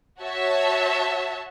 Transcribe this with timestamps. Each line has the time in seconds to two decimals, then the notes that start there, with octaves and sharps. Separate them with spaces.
0.20 F#4 C#5 E5 A5